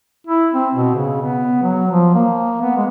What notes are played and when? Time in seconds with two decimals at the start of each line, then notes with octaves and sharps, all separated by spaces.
0.27 E4
0.53 C4
0.74 B2
0.96 C#3
1.22 B3
1.63 F#3
1.92 F3
2.15 A#3
2.62 B3
2.77 G#3